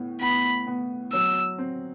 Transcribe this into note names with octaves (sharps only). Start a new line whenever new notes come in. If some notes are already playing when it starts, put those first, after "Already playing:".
Already playing: A2 B3
B3 B5
B3
F#3 E6
C4